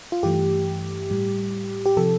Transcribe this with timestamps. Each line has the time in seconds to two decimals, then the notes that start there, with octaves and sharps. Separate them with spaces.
0.12 F4
0.23 G2 E3 A3 G4
1.11 A2 G3
1.86 G4
1.97 C3 F3 A4